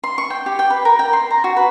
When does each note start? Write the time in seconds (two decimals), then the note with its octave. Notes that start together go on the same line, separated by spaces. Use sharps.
0.04 C6
0.18 C#6
0.30 G5
0.46 G4
0.59 G5
0.70 B4
0.85 A#4
0.99 G5
1.13 C6
1.30 A#5
1.44 F#4
1.57 B4